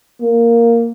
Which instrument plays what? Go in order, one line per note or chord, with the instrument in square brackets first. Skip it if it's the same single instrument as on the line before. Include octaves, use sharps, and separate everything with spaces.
[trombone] A#3